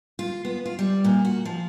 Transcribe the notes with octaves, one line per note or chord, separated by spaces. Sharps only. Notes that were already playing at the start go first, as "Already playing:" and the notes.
F4
B3
F4
G3
A#2
F#4
F3